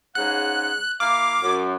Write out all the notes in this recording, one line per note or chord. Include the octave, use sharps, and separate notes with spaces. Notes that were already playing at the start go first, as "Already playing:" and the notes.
G#2 C#3 F#5 F#6
A#3 E4 F5 D6
F#2